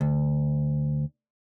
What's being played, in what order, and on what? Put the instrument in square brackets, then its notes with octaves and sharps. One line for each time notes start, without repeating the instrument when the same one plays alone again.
[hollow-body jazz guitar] D2